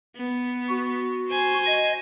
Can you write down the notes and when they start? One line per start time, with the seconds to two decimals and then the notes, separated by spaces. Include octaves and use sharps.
0.16 B3
0.69 F#4
1.28 C5 G#5
1.66 D#5